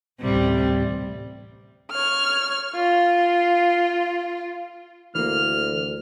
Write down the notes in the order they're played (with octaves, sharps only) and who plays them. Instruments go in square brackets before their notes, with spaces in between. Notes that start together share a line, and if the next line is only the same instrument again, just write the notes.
[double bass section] A1 D2 [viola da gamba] C3 G3
[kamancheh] C#5 F6
F4
[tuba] D2 [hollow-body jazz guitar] E3 A#3 [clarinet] F6